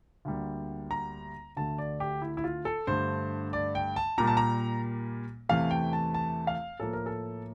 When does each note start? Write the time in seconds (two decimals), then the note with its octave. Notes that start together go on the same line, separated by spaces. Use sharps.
0.25 D2 D3 G3 A#3
0.91 A#5
1.57 D2 D3 A3 A5
1.78 D5
2.00 G4
2.22 E4
2.37 E4
2.44 F4
2.65 A4
2.87 G2 D3 A3 C5
3.53 D5
3.75 G5
3.96 A5
4.18 A#2 G3 A#3 A#5
4.27 A5
4.37 A#5
5.49 E2 C3 E3 A3 F5
5.71 G5
5.93 A5
6.14 A5
6.47 F5
6.80 A2 F3 A#3 A4
6.93 A#4
7.06 A4